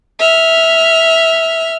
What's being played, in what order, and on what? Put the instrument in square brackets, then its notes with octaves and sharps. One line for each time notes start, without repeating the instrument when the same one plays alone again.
[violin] E5 F6